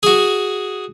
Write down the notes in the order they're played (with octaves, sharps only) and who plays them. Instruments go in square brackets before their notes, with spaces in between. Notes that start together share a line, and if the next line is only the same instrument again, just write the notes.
[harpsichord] F#4 G#4